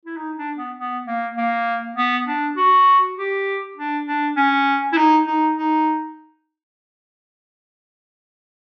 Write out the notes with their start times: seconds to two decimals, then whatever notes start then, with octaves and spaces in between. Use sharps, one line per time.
0.05 E4
0.17 D#4
0.37 D4
0.57 B3
0.77 B3
1.07 A#3
1.37 A#3
1.97 B3
2.27 D4
2.57 F#4
3.17 G4
3.77 D4
4.07 D4
4.37 C#4
4.93 E4
4.97 D#4
5.27 D#4
5.57 D#4